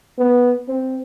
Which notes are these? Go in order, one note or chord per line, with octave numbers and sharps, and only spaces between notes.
B3
C4